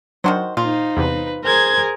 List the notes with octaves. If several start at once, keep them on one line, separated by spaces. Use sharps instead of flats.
D#3 F#3 D4 F#4 C5
A#2 D#4 F4 C5
E2 C3 B4
G#4 A#4 C5 G#6